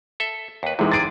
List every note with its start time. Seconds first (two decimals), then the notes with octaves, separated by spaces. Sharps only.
0.20 A4 E5
0.63 D#2 B4
0.79 F#2 C3 E3 G#3 D#4
0.92 C3 G#4 A6 D7